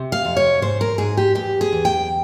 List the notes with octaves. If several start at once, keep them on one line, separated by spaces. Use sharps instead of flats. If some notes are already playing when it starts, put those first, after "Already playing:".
Already playing: C3
F5
F2
C#5
G#2 C5
A#4
G#2 G#4
G4
E2 G4
G#4
E2
G5